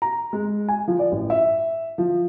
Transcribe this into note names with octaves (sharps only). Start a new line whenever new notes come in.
A#5
G#3
G#5
F3
D5
A1
E5
F3